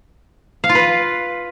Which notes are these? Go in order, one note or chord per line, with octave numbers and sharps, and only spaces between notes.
F5
F4
B4